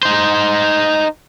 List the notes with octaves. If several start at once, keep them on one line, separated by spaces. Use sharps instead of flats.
D#4 C5